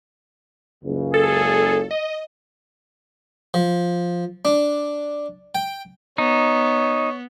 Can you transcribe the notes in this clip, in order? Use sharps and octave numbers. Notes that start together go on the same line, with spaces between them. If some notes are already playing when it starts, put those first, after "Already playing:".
F#1 C#2 C#3
G#4 A4
D#5
F3
D4
G5
B3 D#4 C#5